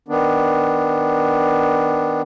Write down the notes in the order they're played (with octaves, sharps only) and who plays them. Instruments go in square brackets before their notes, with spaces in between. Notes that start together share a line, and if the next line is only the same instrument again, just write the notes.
[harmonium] D#3 B3 D4